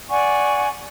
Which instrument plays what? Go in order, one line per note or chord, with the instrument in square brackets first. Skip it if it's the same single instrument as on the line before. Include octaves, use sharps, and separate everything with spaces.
[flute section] D5 F#5 G#5 C#6